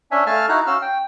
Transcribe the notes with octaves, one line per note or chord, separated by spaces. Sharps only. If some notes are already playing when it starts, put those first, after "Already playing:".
C#4 D4 E5 G#5
A3 F5 G#5 A5 F6
D#4 E4 F#4 A#5 F#6
C#4 F#4 F5 E6 F6
G5